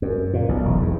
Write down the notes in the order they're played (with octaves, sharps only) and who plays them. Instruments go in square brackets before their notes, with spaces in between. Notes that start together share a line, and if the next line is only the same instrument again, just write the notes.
[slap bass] F#2
A#2
B1
E1
E2